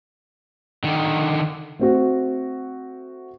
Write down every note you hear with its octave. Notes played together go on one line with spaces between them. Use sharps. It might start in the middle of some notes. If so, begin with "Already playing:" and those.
D3 D#3
A3 C4 F#4